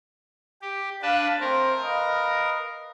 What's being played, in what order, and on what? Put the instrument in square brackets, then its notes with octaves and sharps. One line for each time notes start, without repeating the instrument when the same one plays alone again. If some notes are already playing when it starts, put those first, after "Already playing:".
[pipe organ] G4
[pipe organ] D4 B4 A5 [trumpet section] F5
[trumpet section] A3 C4 C5 [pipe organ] A#4
[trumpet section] B4 D#5 F5